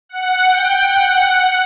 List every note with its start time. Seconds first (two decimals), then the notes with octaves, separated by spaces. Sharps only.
0.09 F#5
0.47 G5
0.84 F#5